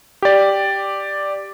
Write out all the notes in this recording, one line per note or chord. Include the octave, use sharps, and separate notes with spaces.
G4 D5